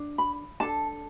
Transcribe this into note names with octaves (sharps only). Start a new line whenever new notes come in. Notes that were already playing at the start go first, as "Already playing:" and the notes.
Already playing: D4
B5
D4 A4 A5